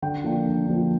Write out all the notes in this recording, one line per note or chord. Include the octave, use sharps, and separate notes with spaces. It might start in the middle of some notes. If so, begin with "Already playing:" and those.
D3 G5
F3 A#3 D4
D3
F3 A#3 D4